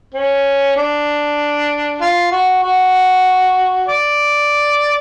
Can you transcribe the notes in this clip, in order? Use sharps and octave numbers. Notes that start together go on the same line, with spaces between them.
C#4
D4
F4
F#4
F#4
D5